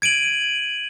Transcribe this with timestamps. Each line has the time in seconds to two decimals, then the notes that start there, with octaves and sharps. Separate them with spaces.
0.02 G#6 D7 D#7 F#7